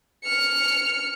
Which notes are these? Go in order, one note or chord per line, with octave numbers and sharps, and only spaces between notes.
F6 C#7